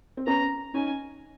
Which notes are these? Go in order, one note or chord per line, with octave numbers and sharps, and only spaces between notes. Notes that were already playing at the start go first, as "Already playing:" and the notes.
C4
B3 C#4 A#5
C#4 D#4 G#5